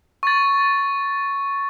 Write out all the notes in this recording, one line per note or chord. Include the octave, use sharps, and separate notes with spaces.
C#6 A6